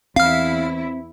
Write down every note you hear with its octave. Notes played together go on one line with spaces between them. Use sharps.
E2 C4 E4 F5 F6